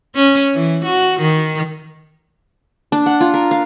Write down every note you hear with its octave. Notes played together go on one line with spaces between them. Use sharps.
C#4
E3
F#4
D#3
D4
F#5
F4
A#4
F5